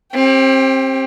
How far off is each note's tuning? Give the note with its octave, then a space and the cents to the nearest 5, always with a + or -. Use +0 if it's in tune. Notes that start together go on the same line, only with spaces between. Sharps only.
C4 +30 G4 +0